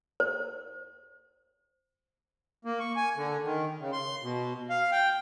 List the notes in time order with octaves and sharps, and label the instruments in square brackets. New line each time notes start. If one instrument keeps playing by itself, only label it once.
[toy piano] C5
[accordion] A#3
C#6
G#5
D3
D#3
C#3
C6
B2
F5
G5